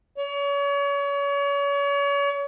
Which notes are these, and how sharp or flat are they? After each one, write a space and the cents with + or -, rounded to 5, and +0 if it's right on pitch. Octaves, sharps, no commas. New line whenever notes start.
C#5 +35